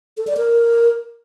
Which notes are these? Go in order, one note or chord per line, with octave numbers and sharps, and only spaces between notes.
A4
D5
A#4